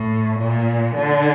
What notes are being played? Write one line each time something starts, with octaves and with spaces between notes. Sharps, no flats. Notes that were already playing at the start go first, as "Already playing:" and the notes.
Already playing: A2
A#2
D3